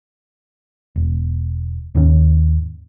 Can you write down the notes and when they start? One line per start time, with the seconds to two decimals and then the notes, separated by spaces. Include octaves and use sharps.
0.96 E1
1.95 D#2 G#2 D#3 C#4